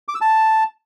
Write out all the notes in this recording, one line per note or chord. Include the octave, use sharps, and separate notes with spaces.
D6
E6
A5